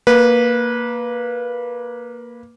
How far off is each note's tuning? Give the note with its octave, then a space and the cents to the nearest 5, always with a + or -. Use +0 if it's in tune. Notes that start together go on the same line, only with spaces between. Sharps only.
A#3 +0 B4 -15